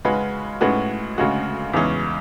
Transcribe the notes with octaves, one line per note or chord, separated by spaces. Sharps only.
C#3 G#3 C#4 F#4 B4
A2 G#3 C#4 F#4 B4
D2 C#3 G#3 C#4 F#4
E2 C#3 E3 G#3 C#4